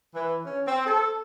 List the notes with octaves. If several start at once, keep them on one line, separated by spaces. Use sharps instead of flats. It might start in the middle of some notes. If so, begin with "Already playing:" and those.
E3
C#4
C4
A4